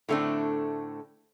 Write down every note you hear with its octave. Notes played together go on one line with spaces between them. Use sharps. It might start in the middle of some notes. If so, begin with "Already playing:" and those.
A2 D3 A3 C4 D4